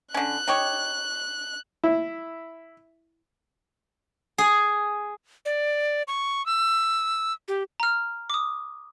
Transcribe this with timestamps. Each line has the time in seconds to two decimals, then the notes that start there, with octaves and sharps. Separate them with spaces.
0.14 D3 C#4 F#6
0.48 D#4 G4 C#5
1.84 E4
4.38 G#4
5.46 D5
6.08 C#6
6.46 E6
7.48 G4
7.80 A#5 F6
8.30 D6 D#6